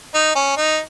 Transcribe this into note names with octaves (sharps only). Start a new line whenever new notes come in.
D#4
C#4
D#4